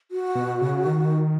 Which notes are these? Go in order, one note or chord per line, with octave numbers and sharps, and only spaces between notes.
F#4
B2
C#3
D#3